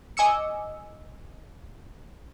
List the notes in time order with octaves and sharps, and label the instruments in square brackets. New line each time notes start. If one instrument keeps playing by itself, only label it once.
[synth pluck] D#5 G#5 D6 E6 C#7